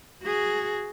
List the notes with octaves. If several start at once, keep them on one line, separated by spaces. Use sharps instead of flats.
F#4 G#4